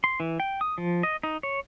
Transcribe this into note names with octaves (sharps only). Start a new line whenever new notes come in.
C6
E3
G5
D#6
F3
D#5
D#4
C#5